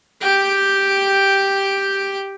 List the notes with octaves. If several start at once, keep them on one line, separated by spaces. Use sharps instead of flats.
G4 G5